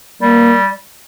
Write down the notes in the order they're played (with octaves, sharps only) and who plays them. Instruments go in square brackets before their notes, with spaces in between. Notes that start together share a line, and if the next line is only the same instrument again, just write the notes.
[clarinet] G3 [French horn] A#3